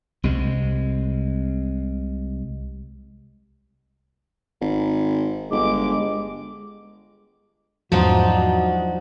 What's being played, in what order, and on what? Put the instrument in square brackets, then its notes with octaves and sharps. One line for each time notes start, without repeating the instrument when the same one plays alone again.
[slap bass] C2 C3 G#3
[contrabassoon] G#1
[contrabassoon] G1 [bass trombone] G#3 [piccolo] D6
[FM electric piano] E2 G#2 [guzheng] F3 D4 D#4 [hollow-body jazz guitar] F#3 C5 [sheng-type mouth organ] F#4